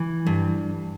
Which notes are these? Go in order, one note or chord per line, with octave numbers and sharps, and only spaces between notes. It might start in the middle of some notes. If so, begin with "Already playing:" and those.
Already playing: E3
G2